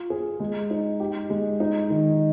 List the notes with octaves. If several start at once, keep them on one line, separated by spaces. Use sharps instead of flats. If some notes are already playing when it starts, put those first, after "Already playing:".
Already playing: F4
G#4
G#3
D#4
G4
G#3
D#4
D#3